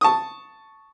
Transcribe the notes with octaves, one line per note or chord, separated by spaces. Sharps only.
A5 C#6 D#6